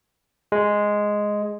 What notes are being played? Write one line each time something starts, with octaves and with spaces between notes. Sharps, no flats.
G#3